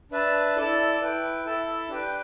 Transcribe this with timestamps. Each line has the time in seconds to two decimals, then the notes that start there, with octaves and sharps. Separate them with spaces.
0.11 D4 B4 E5 A5
0.56 E4 A4 D5 A5
1.00 E4 B4 G5
1.45 E4 A4 E5 A5
1.89 D4 G4 B4 G5